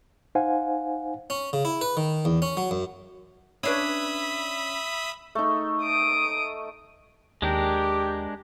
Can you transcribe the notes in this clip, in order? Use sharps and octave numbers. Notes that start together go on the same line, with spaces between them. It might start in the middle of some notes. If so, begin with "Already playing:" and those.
D#4 C5 F5 F#5 G#5
C#4
C#3
E4
B4
D#3
E2
C#4
F#3
F#2
C#4 D4 B4 E5 B5 D#6
A3 D#4
D#6 D7
D#2 G#3 D4 G4 A#4